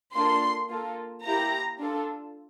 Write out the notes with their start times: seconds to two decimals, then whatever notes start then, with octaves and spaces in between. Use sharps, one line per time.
0.14 A#3 D4 F4 A4 C6
0.69 A#3 F4 A4
1.24 A#3 E4 G4 A#5
1.79 D4 F4 A4